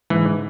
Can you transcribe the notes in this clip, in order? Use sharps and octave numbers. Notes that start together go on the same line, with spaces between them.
G#2 E3